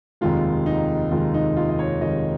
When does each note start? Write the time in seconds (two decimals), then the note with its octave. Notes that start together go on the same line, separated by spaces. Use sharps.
0.21 F1 D#2 D#3 G#3 F4
0.66 D#4
1.11 F1 D#2 D#3 G#3 F4
1.34 D#4
1.56 F4
1.69 D#5
1.79 C#5
2.01 F1 D#2 D#3 G#3 D#5